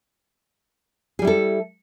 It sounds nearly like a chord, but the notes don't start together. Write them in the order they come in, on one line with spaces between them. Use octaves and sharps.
G#4 G3 E4 A4